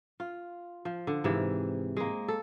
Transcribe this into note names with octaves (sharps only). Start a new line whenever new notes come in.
F4
F3
D3
G#2 C3 E3
G#3 A#3
A4